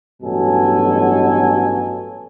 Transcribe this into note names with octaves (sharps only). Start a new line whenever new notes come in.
A1 G2 B2 F#3 A4 G#5